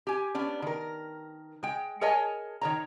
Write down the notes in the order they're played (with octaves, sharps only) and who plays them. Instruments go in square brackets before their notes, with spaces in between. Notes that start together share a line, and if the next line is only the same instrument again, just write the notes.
[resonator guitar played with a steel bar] G4 G#5
B3 C#4 D4
D#3 A#4
G#3 G5
G#4 A#4 C#5 D#5 G#5 A5
D#3 C#5 A#5